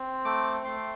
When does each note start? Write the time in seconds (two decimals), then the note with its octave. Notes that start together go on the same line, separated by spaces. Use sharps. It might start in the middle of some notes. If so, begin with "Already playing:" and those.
Already playing: C4
0.25 A3 D6
0.65 A3 C6